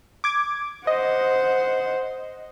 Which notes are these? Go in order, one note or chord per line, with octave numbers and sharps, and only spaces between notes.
D6 G#6
C5 D#5 F#5